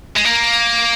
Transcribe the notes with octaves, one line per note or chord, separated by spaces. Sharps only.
G#3
A#3